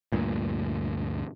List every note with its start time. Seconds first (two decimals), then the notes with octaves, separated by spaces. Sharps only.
0.12 D2 G2 A#2